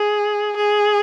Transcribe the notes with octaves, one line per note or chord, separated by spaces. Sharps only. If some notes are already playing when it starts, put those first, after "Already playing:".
Already playing: G#4
G#4